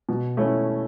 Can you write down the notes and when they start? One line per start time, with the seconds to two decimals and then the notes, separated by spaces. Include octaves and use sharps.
0.09 B2
0.37 A3 C#4 E4